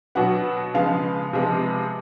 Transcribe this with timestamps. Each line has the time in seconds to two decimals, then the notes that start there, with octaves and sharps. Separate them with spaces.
0.15 B2 F#3 B3 F#5
0.74 C#3 F3 G#3 B3 F5
1.33 C3 F3 G#3 B3